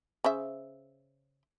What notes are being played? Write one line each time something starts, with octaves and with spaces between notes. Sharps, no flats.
C#3 C5 E5